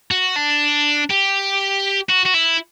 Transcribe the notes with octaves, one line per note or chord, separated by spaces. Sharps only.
F#4
D4
G4
F#4
F#4
E4